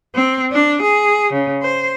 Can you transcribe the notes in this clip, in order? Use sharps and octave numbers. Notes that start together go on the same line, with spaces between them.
C4
D4
G#4
C#3
C5